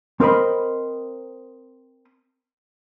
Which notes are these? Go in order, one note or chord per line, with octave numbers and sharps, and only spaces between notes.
C4 A#4 C5 D#5 B5